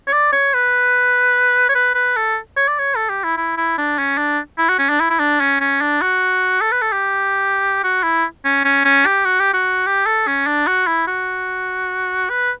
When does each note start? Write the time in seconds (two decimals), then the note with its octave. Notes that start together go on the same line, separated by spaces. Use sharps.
0.07 C#5
0.13 D5
0.32 C#5
0.54 B4
1.69 C#5
1.75 B4
1.95 B4
2.16 A4
2.57 C#5
2.68 D5
2.79 C#5
2.96 A4
3.09 G4
3.24 E4
3.37 E4
3.57 E4
3.78 D4
3.99 C#4
4.18 D4
4.58 E4
4.69 F#4
4.78 C#4
4.89 D4
5.00 E4
5.10 E4
5.19 D4
5.41 C#4
5.61 C#4
5.81 D4
6.01 F#4
6.61 A4
6.72 B4
6.81 A4
6.92 G4
7.84 F#4
8.03 E4
8.45 C#4
8.65 C#4
8.85 C#4
9.06 G4
9.25 F#4
9.40 G4
9.53 F#4
9.87 G4
10.06 A4
10.27 C#4
10.47 D4
10.67 F#4
10.87 E4
11.07 F#4
12.30 B4